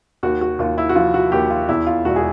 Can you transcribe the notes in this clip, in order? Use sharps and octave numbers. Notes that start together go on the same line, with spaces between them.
D#2 F#4
F#4
D#2 F4
E4
F#4
F3 F4
F#4
D#2 G4
F4
E2 E4
F4
E1 F#4
G#4